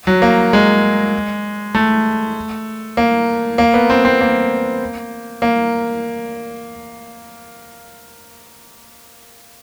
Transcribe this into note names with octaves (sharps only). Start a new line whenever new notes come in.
F#3
A#3
G#3
A3
A#3
A#3
B3
C4
C4
A#3
A#3